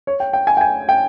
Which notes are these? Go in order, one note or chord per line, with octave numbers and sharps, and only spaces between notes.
C#5
G5
G5
G#5
G5
G#5
G5